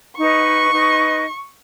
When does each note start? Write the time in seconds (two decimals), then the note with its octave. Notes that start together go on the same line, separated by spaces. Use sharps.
0.18 D#4 B4 D#5 C#6
0.71 D#4 B4 D#5